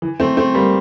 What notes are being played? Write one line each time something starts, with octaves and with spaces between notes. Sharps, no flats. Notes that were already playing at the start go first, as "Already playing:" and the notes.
E3
A3 C4
A3 C4
G3 A#3